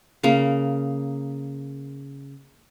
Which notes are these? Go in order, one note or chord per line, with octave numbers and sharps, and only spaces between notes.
C#3 A#3